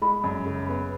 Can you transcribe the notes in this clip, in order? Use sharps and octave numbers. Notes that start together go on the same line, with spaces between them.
G#3 B5
F#2
C#3
B3